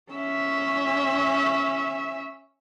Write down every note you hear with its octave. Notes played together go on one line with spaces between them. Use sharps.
C#4 E5